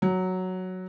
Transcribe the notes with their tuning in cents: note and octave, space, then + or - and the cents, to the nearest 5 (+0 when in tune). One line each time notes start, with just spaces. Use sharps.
F#3 +0